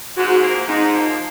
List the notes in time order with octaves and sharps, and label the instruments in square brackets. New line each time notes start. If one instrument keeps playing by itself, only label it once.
[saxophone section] G#2 [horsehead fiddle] F#4
[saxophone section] F3 A#3
[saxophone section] G#2 [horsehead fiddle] D#4
[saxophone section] F3 A#3